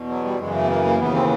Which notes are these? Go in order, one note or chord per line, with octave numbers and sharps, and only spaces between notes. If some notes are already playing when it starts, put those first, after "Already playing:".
Already playing: E2 B2
F#3
G3
F#2 C#3 E3 G#3
A3
B3
A#3
A#3
D#2 C#3 E3 B3
C4